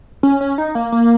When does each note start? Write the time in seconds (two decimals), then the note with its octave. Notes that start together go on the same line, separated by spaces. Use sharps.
0.23 C#4
0.41 C#4
0.58 D#4
0.75 A#3
0.92 A#3